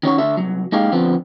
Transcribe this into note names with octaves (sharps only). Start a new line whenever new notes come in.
D#3 C#4 F#4 C#5
D3 A4 E5
C2 F#3
G#3 A#3 D#4 G4 G#4 F5
D3 F3 B3 C4